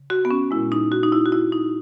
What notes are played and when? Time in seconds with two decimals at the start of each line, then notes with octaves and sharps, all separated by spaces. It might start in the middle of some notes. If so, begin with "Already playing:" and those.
Already playing: C#3
0.10 F#4
0.25 B3
0.31 C#4
0.51 A#2 G#3 E4
0.72 D#4
0.92 F#4
1.03 D#4
1.12 E4
1.26 F#4
1.32 E4
1.52 D#4